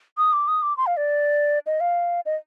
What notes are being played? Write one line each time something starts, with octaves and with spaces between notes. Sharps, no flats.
D#6
D6
D#6
D6
C6
F5
D5
D#5
F5
D#5